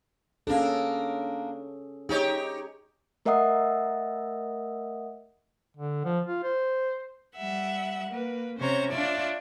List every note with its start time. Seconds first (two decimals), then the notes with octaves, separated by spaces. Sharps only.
0.47 A#3 C#4 D4 G#4 A4
2.09 D#4 G4 G#4 C#5
3.25 A3 A#4 D#5 E5 F#5 D#6
5.77 D3
6.05 F3
6.27 F4
6.43 C5
7.36 G3 E5 F#5
8.10 A#3 B4
8.59 C3 C#4 C5 C#5 A#5
8.90 D4 F4 C#5 D5 E5